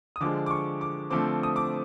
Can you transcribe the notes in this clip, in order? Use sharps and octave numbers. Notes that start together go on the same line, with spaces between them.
D#6
D3 F3 G#3 D6
D6
C#6
D6
D3 F3 A3 C4 D6
D#6
D6